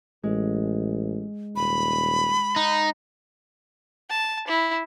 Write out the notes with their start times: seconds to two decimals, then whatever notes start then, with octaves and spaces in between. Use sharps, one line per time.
0.23 A1 G#3
1.56 D#1 B5
2.56 D#4 F#6
4.10 A5
4.47 E4